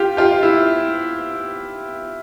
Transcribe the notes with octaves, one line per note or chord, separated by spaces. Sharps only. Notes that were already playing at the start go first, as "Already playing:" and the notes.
Already playing: F4 G4
F4 G4
E4